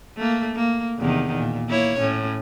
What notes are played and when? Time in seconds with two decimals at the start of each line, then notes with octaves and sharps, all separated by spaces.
0.17 A3 A#3
0.55 A#3
0.99 E2 C3 D#3
1.37 A#2
1.68 A#3 E4 C#5
2.00 A2 C#4